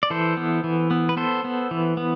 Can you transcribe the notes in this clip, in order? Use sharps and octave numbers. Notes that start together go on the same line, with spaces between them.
D5
E3 A4 C5
B3
E3
B3
B4
B3 A4 C5
B3
E3
B3